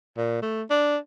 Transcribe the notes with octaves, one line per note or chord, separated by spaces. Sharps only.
A#2
A3
D4